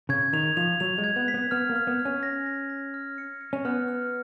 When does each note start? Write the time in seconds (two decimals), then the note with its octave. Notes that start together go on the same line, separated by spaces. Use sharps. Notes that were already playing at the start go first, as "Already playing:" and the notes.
0.09 C#3 G#6
0.33 D#3 F7
0.57 F3 F7
0.80 F#3 F7
0.98 G#3
1.04 G#6
1.16 B3
1.28 B6
1.34 B3
1.51 B3 F6
1.70 A#3
1.76 F6
1.87 B3
1.99 F6
2.05 C#4
2.23 A#6
2.46 A#6
2.70 A#6
2.94 F6
3.18 C#7
3.41 C#7
3.53 C#4
3.65 B3 F6
3.88 F6